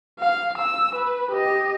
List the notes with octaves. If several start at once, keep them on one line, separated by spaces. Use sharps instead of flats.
F5
E6
B4
G4 D#5